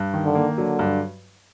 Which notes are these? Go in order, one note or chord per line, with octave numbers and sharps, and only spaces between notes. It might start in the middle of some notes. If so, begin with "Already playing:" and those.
Already playing: G2
D#3
D3
A#3
D3 F#3
G2